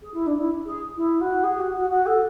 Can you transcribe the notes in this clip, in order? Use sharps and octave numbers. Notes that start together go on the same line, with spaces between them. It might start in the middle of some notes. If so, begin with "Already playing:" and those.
G#4
E4
D4
E4
G#4
E4
F#4
G#4
F#4
F#4
F#4
A4